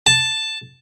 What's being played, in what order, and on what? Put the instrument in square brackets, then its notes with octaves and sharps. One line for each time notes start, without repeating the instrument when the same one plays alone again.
[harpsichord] A5